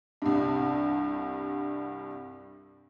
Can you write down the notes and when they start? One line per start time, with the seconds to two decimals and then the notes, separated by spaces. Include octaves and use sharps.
0.22 C2 G2